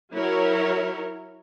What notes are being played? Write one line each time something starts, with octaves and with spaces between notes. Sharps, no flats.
F#3 E4 A#4 C#5